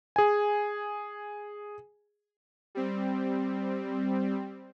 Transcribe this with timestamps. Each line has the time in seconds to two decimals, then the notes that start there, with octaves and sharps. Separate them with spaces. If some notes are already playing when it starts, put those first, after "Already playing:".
0.16 G#4 G#5
2.75 G3 C4